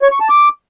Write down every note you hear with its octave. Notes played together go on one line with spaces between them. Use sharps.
C#5
C#6
A5
D6